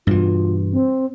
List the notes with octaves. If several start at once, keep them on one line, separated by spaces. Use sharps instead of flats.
G2 B2 E3 F4
C4